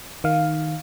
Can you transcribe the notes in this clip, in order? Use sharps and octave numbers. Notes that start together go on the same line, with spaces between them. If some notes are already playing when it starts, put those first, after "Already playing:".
D#3 F5